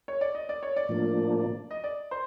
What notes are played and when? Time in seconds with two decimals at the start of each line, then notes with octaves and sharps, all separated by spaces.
0.08 C#5
0.21 D5
0.35 D#5
0.49 D5
0.63 C#5
0.76 D5
0.89 A2 F3 A#3 D4
1.71 D#5
1.84 D5
2.11 C5